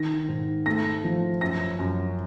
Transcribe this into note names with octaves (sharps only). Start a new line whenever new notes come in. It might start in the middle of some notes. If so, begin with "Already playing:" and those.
Already playing: D#3 A#6
G#2
A3 A#6
F3
F#2 A#6
F#2